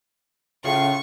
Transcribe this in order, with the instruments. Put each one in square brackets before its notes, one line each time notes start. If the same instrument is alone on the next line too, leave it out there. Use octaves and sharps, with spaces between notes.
[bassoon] A2 [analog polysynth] C#3 F4 C7 [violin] C#6